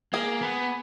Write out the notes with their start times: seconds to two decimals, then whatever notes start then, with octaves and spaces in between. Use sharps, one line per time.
0.13 A#3 G#4
0.41 B3